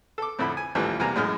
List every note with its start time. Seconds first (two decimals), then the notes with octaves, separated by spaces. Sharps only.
0.18 A4 D6
0.39 F2 A2 D3 E4 A4 B5
0.57 G#5
0.75 A1 D#2 E3 F3 G3 A3
1.00 E2 C3 G3 A#3 G#5 A#5
1.16 F#2 A2 G#3 D#5 F6